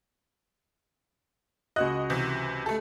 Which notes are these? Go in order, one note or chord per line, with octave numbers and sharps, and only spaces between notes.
C#2 F#4 D#5 F#6
C3 E3
A3 A4